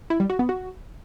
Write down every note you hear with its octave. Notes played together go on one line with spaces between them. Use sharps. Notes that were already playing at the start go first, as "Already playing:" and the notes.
E4
G3
F#4
B3
F#4